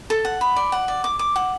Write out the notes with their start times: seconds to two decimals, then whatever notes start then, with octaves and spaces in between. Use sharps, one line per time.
0.10 A4
0.25 F#5
0.41 B5
0.56 D5
0.72 F#5
0.88 D5
1.04 D6
1.19 D6
1.36 F#5